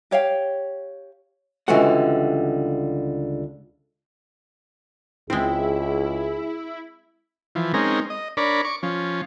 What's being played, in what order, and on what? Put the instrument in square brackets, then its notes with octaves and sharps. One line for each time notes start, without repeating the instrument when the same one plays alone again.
[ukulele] G4 C#5 F5 G5
[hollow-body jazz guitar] C#2 D3 E3 G3 F#4 F#5
[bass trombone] C#2 [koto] G#3 C4 [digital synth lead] E4 [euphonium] G#4
[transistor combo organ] E3 F3
G#3 C4 C#4 D#4 A#4
D#5
D4 A#4 C#5 D5 B5
C#6 D6
F3 C#4